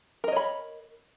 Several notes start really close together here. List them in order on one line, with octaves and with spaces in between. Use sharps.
A#4 D#5 C#5 B5